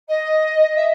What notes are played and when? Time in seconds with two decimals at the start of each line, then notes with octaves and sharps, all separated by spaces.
0.08 D#5
0.76 E5